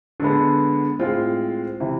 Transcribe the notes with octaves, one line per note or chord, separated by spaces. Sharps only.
D3 G#3 B3
A2 G#3 C4 F4
C3 E3